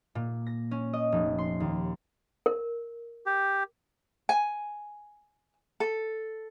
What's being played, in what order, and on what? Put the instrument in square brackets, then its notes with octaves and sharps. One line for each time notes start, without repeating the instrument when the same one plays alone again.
[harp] A#2
A#6
C#4
D#5
F1
C6
D#2
[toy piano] A#4
[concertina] G4
[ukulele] G#5
A4